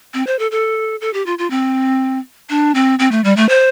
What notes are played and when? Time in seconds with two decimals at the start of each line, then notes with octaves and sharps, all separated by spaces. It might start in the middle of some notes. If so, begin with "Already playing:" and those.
0.14 C4
0.27 C5
0.39 A4
0.51 A4
1.01 A4
1.13 G4
1.26 F4
1.38 F4
1.50 C4
2.49 D4
2.75 C4
2.99 C4
3.11 A3
3.24 G3
3.36 A3
3.49 C5